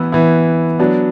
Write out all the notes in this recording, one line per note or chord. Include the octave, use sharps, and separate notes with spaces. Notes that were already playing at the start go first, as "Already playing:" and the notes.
Already playing: E3 B3 E4 E6
E3 B3 E4
F#3 B3 D4